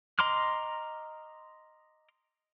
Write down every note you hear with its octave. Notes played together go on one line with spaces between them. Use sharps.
D#5 A#5 C6 D6 F6